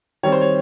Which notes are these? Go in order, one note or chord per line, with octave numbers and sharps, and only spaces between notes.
D#3 G3 C4 C#5
C5
C#5